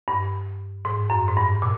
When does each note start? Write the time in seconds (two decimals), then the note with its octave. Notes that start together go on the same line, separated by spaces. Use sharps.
0.08 G2
0.85 G#2
1.10 F#2
1.28 G#2
1.37 G2
1.62 A#2